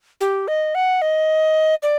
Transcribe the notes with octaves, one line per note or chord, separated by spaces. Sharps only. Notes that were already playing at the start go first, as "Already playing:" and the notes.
G4
D#5
F#5
D#5
D5